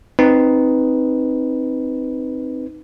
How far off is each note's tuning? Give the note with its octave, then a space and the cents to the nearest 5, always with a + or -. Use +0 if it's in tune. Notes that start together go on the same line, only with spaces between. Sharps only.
C4 +0 D#4 +0 B4 +0